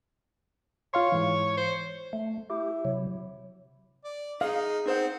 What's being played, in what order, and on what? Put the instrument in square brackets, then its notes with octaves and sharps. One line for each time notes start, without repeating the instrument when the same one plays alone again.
[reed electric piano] F4 F5 C6 [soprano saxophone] C#5
[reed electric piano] G#2 E3
[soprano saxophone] C5
[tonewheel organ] A3
[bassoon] E4 [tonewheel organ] G4
[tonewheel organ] C3 F#3
[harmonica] D5
[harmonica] D#4 [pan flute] G#4 [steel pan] F5
[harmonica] C4 [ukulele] D#4 C5 F#5